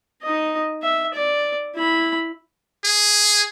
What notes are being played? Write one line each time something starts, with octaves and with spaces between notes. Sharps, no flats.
D#4 D#5
E5
D5
E4 B5
G#4